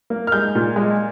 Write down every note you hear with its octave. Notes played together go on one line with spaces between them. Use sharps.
A#3
F6
G#3 G6
A#2
G#3